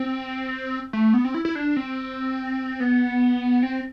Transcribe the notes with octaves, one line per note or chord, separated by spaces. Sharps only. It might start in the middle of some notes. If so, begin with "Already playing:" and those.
Already playing: C4
A3
B3
C4
E4
E4
D4
C4
B3
C4